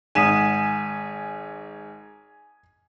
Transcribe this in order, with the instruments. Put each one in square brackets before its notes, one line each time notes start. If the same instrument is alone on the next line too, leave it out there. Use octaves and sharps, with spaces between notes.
[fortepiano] G#1 F#5 [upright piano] G#5 E7 [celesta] D#6 B6 D#7